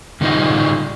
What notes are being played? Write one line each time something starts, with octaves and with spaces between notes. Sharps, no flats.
A2 D3 G3 D#4 F4 D#5